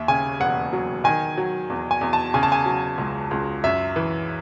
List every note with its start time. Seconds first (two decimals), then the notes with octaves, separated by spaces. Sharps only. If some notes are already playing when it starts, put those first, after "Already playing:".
Already playing: D#2 E5
0.08 C#3 G#5
0.40 E1 F#5
0.73 F#3
1.04 D#3 G#5
1.38 F#3
1.70 E2
1.91 G#5
2.01 E2
2.13 A5
2.34 C#3 G#5
2.43 A5
2.52 G#5
2.66 F#3
2.98 C#2
3.31 C#2
3.64 F#2 E5
3.96 E3